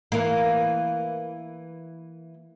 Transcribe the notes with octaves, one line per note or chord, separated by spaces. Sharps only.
E3 A#3